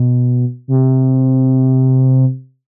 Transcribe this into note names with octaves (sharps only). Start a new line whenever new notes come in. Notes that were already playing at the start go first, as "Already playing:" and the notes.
Already playing: B2
C3